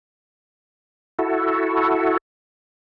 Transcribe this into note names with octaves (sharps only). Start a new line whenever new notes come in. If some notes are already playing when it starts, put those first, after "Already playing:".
E4 F#4 A4